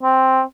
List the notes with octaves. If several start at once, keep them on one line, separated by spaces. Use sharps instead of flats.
C4